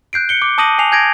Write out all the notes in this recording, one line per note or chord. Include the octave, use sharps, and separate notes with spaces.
F#6 G6 C7 D7
C#7 G7
D6
A5 D6 D#6 A#6 D#7 F#7
G#5 C7 F7
G#5 G6 G#6 A#6 D7